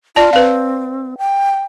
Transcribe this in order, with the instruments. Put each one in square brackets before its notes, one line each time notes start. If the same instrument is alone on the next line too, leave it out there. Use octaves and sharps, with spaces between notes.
[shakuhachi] F4 [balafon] D5 A5
[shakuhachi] C4 [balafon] B4 F5
[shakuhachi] G5